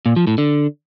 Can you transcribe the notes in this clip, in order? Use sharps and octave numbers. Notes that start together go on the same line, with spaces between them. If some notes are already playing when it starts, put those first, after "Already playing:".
A#2
F3
A2
D3